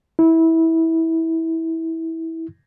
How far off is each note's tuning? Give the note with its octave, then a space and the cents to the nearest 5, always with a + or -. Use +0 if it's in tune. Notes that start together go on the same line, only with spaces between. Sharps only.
E4 -20